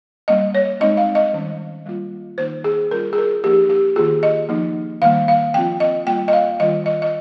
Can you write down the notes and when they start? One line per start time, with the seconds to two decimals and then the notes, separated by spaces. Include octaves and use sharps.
0.28 G3 A#3 C#4 D#5
0.55 C#5
0.80 G#3 C4 D#4 D#5
0.97 F5
1.15 D#5
1.33 D#3 G3 C#4
1.86 G3 A#3 F4
2.38 D#3 A#3 D#4 C5
2.64 G#4
2.91 G3 C#4 F4 A#4
3.13 G#4
3.18 A#4
3.44 F3 A#3 D#4 G4
3.69 G4
3.96 D#3 A#3 F4 G#4
4.23 D#5
4.49 F3 A#3 D#4
5.02 D#3 G3 A#3 F5
5.28 F5
5.54 F3 C4 F4 G5
5.80 D#5
6.07 G3 A#3 F4 G5
6.28 D#5
6.33 F5
6.60 D#3 G3 C#4 F4 D#5
6.86 D#5
7.02 D#5